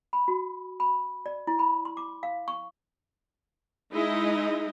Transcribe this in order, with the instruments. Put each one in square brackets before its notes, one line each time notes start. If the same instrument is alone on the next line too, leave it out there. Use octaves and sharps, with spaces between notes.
[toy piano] B5
F#4
B5
D5
E4
B5
C6
D6
F5
C#6
[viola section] G#3 D#4 E4 D#5